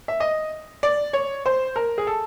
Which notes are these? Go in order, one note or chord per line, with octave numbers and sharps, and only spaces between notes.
E5
D#5
D5
C#5
C5
A#4
G#4
A4